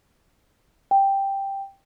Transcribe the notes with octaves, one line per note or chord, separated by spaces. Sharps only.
G5